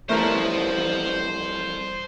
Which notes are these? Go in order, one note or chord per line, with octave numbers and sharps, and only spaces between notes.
F2 E3 G3 A3 A#4 C5 A5